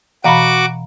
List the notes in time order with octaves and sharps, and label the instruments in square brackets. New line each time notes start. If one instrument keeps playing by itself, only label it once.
[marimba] B2 E3 [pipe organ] F#4 D6 [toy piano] F5 A#5 [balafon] F#5 B5